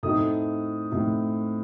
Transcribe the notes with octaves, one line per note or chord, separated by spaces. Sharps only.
A2 A3 C4 D#4 D#6
A2 A3 C4 D#4